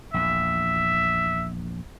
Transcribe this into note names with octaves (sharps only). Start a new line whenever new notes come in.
A#1 E2 E5